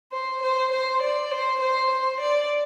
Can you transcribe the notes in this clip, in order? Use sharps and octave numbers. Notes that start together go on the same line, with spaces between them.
C5
C5
C5
D5
C5
C5
C5
D5